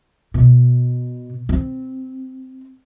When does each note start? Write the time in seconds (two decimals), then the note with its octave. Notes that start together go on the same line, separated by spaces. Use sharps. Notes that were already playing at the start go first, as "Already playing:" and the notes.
0.34 B2
1.49 C4